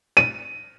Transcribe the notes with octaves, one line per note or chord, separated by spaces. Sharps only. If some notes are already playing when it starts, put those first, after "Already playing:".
D#7